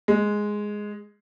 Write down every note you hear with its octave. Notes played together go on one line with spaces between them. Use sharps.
G#3